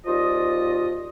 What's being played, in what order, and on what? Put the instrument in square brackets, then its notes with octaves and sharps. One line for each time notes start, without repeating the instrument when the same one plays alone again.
[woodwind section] D#2 F3 F4 D5 D#5